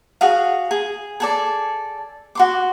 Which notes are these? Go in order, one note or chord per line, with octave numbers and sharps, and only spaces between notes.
F#4 G#4 F5
G#4
G#4 A4 D5
F#4 C6 D6